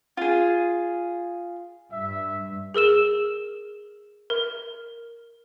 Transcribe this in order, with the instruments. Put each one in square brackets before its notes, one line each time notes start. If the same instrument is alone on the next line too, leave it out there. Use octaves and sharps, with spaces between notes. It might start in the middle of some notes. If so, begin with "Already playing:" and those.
[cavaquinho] F4 G#4
[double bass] G2 [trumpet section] E5
[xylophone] G#4 A#4 E6 E7
A#4